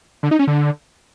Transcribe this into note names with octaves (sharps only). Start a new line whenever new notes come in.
D3
D#4
C#4
D3